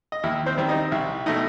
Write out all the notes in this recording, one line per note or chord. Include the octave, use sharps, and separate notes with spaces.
D#5
D#2 E4 E5
C4 C5
D#3 G3 C4
D#4 D#5
C2 E4 E5
B2 A3 D#4 E4 D#5